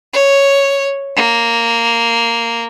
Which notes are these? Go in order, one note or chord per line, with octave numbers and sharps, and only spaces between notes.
C#5
A#3